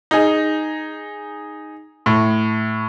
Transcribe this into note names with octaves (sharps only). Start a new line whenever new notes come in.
D#4 G#4
A2